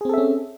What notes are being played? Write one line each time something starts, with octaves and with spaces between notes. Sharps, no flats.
C4 C#4 G#4 A4 E5